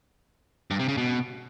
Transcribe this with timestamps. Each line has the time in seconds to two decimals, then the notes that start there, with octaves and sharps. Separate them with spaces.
0.71 G2
0.79 C3
0.88 C#3
0.97 B2